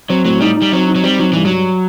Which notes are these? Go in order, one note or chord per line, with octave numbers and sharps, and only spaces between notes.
F#3 C4
A2 F#3
G3 D#4
D#4
G3
F#3 C4
D#4
F#3
G3 C4
F#3 D#4
G2 E3
G2 F#3